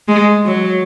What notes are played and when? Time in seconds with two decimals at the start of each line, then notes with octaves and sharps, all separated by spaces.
0.08 G#3
0.46 F#3